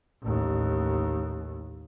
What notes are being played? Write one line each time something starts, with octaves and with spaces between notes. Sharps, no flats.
A1 D#2